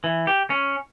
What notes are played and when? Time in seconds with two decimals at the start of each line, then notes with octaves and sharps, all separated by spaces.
0.04 E3
0.27 G4
0.50 C#4